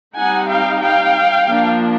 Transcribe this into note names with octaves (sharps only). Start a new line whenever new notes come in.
G3 C4 D#4 F#5 G#5
F5 G5
F5 G5
F3 A#3 D4